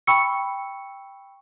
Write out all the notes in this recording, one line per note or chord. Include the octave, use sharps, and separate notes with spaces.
G5 B5 C#6 E6 C#7